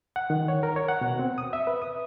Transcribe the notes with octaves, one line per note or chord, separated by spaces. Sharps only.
F#5
D#3
C#5
A#4
C#5
F#5
B2
C4
D#6
E5
B4
D#6